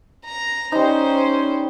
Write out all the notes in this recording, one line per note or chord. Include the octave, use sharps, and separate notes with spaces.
A#5
G3 C#4 D#4 C5